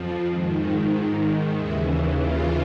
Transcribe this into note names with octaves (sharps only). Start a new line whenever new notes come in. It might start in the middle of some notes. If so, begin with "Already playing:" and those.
Already playing: F2 F3
G#2 D#3
D#2 C#3 E3 E4
F4